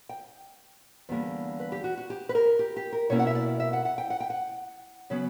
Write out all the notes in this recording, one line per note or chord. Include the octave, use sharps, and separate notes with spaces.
G5
E2 D3 G3 A#3
B4
G4
F#4
F#4
G4
B4
A#4
G4
G4
A#4
B2 A#3 C#4 E4 C#5
F#5
E5
D5
E5
F#5
F#5
G5
F#5
G5
F#5
C#3 F#3 B3